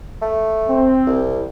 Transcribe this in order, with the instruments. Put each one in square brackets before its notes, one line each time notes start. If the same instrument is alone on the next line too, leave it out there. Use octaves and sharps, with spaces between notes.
[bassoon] A3
[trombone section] C4
[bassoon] C2